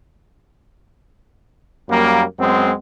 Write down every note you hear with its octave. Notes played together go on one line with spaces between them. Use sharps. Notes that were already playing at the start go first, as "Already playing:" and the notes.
F#2 G3 A#3
F#2 G#3 B3 C4